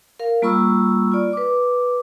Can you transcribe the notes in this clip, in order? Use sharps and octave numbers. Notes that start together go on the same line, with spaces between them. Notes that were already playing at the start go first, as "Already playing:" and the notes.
A#4 F5
G3 A#3 F4 B5 C#6 E6
F4 D5
B4 D6